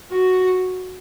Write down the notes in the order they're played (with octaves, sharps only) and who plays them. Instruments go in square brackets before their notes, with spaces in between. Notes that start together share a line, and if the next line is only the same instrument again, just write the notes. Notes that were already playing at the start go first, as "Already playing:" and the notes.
[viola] F#4